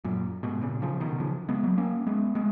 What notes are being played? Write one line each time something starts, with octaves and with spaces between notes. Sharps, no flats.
F#2 A#2
G#2 B2
A#2 C#3
C#3 F3
B2 D#3
C#3 F3
G#3 B3
F#3 A#3
A#3 C#4
G#3 B3
G#3 B3